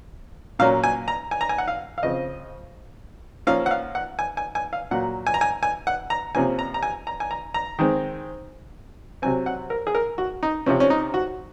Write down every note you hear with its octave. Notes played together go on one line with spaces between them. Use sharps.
A#2 F#3 A#3 C#4 F5
G#5
A#5
G#5
A#5
G#5
F#5
F5
F5
C#3 F3 C4 D#5
F3 A#3 C#4 F5
F#5
F5
F#5
G#5
G#5
G#5
F5
A#2 F#3 A#3 F#5
G#5
A#5
G#5
G#5
F#5
A#5
C3 F3 A#3 C#4 G#5
A#5
A#5
G#5
A#5
G#5
A#5
A#5
D#3 G#3 C4
C3 F#3 C4 G#5
F#5
A#4
G#4
A#4
F#4
D#4
C3 F3 C4 C#4
C#4
D#4
F#4